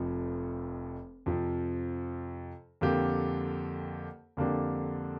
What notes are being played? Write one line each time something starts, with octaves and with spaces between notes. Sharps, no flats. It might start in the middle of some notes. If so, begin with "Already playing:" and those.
Already playing: F1 F2 F3
F2 C3 F3
F2 D3 A#3 G4
F2 D3 A#3 D4 G4